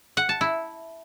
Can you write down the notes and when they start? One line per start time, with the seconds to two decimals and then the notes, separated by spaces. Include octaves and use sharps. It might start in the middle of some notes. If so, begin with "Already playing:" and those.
0.17 F#5
0.29 A5
0.41 E4